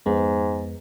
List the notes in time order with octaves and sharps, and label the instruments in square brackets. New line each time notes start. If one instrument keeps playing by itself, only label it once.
[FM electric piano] F2 G#3 B3 [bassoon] G#2